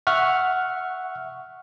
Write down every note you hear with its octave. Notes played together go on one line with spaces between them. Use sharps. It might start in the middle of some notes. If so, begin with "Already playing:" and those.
E5 F#5 C#6 F6